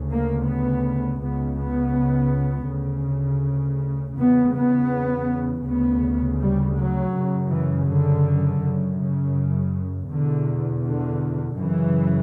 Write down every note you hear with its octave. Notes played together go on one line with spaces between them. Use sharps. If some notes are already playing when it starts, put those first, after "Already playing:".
Already playing: D2 C#3
A#3
B3
C#2 C#3 B3
B3
D2 C#3
E2 C#3 B3
B3
D2 C#3 B3
G3
F#3
F#2 C#3
E3
D3
F#2 C#3
C#3
E2 B2 D3
D3
F#2 C#3 E3